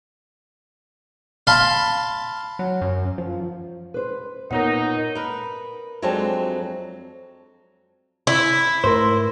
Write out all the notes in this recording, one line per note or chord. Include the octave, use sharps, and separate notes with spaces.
F5 A5 B5 C6
F#3
F#2
F3
B4 C5
A#2 B3 D#4 A#4 C#5 F#5
A#4 B4
F2 F#3 G#3 C4 D4 A5
E4
G#2 A3 A#4 C5